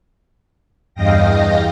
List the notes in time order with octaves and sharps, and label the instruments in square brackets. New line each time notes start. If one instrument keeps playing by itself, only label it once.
[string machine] E2 G2 D#5 F5 G5 A#6